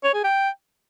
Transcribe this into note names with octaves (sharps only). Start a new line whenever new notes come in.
C#5
G#4
G5